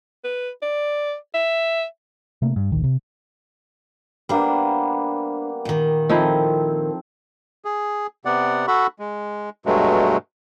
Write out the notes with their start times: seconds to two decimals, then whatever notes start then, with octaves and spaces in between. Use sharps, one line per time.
0.24 B4
0.62 D5
1.34 E5
2.42 C3 A3 A#3
2.56 G2
2.72 D1 A#1 D#3
2.84 C3
4.29 G3 A#3 B3 D4 C5
5.65 A#2 D#3
6.09 F3 C4 D#4 E4 A4
7.65 G#4
8.25 C3 B3 D5 F#5
8.68 F#4 A4 F#5 B5 C#6
8.99 G#3
9.66 G2 B2 F#3 G#3 A3